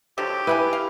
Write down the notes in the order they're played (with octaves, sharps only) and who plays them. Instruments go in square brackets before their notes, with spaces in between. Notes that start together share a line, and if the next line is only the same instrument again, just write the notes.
[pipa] D3 F3 F#3 [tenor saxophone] G4
[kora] E4 [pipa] B4 F#5 G#5
[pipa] F5